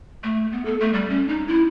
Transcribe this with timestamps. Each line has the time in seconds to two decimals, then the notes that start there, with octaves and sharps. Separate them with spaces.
0.24 A3
0.52 B3
0.65 A4
0.81 A3
0.93 G3
1.10 C#4
1.28 D#4
1.47 E4